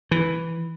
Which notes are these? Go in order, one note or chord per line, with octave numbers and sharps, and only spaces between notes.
E3